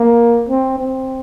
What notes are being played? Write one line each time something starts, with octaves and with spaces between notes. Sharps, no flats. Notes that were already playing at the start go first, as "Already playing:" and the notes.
Already playing: A#3
C4
C4